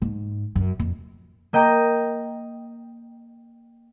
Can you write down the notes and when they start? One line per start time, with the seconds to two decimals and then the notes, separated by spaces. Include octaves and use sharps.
0.02 G#2
0.56 F#2
0.79 F2
1.53 A#3 D#5 G5 A#5 D7